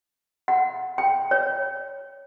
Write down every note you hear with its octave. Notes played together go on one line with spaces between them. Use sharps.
F#5
G5
C#5